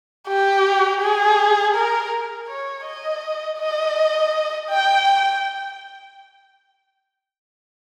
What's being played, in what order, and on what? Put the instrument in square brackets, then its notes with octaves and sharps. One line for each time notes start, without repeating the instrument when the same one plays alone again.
[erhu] G4
G#4
A#4
C#5
D#5
D#5
G5